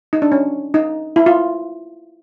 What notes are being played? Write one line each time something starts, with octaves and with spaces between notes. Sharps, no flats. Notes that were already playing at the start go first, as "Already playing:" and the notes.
D#4
D4
C#4
D#4
E4
F4